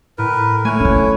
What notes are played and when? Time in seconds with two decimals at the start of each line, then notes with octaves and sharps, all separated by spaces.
0.18 A2 A#4 B4
0.65 A3 E4 C#5 G#5 F#6
0.80 D3 A3 C#4